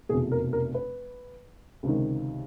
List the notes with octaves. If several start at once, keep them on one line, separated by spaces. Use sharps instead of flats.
F1 E2 B2 G#4
A#4
A#4
B4
C#2 C3 D#3